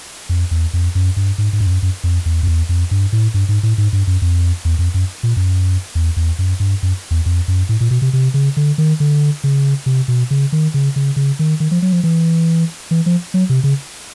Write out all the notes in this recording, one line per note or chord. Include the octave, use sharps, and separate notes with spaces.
F2
E2
F2
F#2
G2
G#2
G#2
G2
F2
F#2
F#2
F2
E2
F2
E2
F2
G2
A2
G2
G#2
A2
G#2
G2
F#2
F2
E2
F2
F#2
A#2
F#2
E2
E2
F#2
G2
F#2
E2
F2
F#2
A2
A#2
B2
C3
C3
C#3
D3
D#3
D3
C#3
C3
B2
C#3
D#3
C#3
C#3
C#3
D#3
D#3
F3
F#3
F3
E3
E3
F3
F#3
C3
C#3